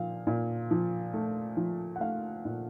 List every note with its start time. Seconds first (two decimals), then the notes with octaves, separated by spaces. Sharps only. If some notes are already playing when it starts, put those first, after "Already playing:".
Already playing: A#2 F3 F5
0.27 A#2
0.71 F3
1.14 A3
1.57 F3
1.96 F#5
2.00 A3 F5
2.45 A#2